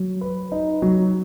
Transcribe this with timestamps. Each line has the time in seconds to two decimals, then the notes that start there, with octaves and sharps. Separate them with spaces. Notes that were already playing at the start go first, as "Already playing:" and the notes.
Already playing: F#3
0.21 B4
0.52 D#4
0.82 F#3